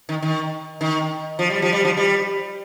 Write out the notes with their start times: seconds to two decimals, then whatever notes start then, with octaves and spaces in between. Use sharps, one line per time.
0.09 D#3
0.22 D#3
0.81 D#3
1.39 F3
1.50 G3
1.62 F3
1.73 G3
1.85 F3
1.97 G3